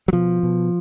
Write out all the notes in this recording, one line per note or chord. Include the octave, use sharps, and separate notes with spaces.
F#3
B2 F3
B2